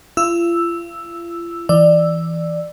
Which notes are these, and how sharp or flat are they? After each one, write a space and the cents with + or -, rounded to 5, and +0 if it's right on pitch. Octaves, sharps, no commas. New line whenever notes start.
F4 -40 E6 +0
E3 +0 D5 +15 E6 +0